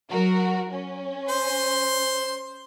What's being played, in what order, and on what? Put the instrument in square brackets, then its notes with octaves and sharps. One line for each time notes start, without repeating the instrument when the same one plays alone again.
[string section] F#3 F#4 A#4
C#4
[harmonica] C5 C6